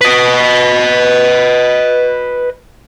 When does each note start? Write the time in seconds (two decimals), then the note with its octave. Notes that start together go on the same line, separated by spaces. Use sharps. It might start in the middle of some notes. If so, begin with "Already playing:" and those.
0.01 B4 D#5